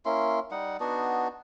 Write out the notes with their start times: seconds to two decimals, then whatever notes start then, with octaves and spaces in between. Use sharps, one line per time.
0.05 A#3 C#4 E4 C6
0.51 G3 D#4 F#5
0.80 B3 D4 D#4 F#4